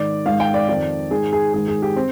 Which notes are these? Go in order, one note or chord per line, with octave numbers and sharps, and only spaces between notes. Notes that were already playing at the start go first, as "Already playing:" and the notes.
Already playing: G#2 D#3 D5
G#2 D#3 F5
G5
D5
F2 D#3 D5
G#2 D#3 G#4
G#4
G#2 D#3 G#4
G#4
G4
C4